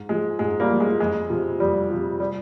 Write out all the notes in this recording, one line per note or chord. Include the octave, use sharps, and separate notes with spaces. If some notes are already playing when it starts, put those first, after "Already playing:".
Already playing: G#2
F3 G#3
G#2 G#3
G3 A#3
F3
G#3
F2 G#3
C3 F3
F2 G3
C3 F3
G3